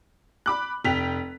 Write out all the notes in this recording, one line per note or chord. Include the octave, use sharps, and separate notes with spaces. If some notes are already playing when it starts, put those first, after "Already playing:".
B5 D6 F#6
F1 G5 B6 F7